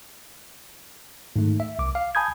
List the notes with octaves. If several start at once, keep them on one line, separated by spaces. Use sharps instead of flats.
G#2 D#3 A3
E5
C2 D6
F5
G#5 A5 B5 D#6 G6 G#6